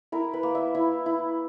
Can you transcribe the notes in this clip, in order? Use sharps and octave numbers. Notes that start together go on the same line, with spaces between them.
E4 A#4
B4
A#3
E5
E4 E5
E4